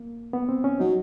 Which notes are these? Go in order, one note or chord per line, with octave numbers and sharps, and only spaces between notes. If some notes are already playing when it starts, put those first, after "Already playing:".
Already playing: A#3
B3
C4
C#4
F#3 D#4